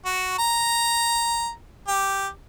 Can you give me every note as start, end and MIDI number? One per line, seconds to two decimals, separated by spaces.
0.06 0.35 66
0.39 1.51 82
1.88 2.28 67